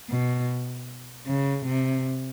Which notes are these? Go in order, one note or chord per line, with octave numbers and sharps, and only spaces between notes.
B2
C#3
C3